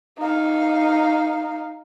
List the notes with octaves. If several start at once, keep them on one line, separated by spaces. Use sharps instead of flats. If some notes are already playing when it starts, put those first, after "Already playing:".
D#4 F5